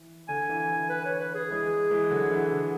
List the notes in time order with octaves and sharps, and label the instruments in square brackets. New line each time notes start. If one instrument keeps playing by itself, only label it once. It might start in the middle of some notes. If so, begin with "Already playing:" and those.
Already playing: [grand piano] E3
[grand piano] D3 [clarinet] G#5
[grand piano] E3
[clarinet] G#5
[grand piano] E3
[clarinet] B4
C#5
B4
G#4
[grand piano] E3 G#3
E3 G#3
D3 F#3
E3
D3